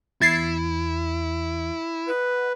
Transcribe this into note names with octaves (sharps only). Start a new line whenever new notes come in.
E2 E3 E4 G#6 A6 C7
B4 D#5 F#5